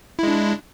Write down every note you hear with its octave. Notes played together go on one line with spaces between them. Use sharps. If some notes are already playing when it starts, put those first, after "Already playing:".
G#3 D4 E4